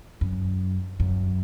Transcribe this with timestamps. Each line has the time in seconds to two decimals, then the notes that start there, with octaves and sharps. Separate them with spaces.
0.21 F#2
1.00 F#2